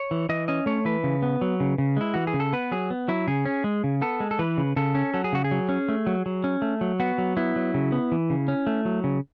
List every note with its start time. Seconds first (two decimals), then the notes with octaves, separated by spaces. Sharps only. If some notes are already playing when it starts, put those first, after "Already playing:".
Already playing: C#5
0.11 E3
0.29 E3 D#5
0.48 C#4 D#5
0.66 A3 C#5
0.85 E3 B4
1.04 C#3
1.22 B3
1.41 F#3
1.60 C#3
1.78 C#3
1.97 G#3 E4
2.14 E3 F#4
2.27 G#4
2.34 C#3
2.40 A4
2.53 B3 B4
2.72 F#3 G#4
2.90 B3
3.08 F#3 E4
3.27 C#3 G#4
3.45 C#4
3.64 G#3
3.84 C#3
4.02 B3 A4
4.20 G#3
4.31 A4
4.39 E3 B4
4.58 C#3
4.76 C#3 A4
4.95 C#4
5.14 F#3 A4
5.24 G#4
5.33 C#3 F#4
5.44 G#4
5.51 F#3
5.69 C#4
5.89 A3
6.07 F#3
6.26 F#3
6.44 C#4
6.62 A3
6.81 F#3
7.00 B3 F#4
7.18 F#3
7.37 B3 E4
7.56 F#3
7.74 C#3
7.92 B3
8.12 E3
8.30 C#3
8.48 C#4
8.67 A3
8.85 F#3
9.04 C#3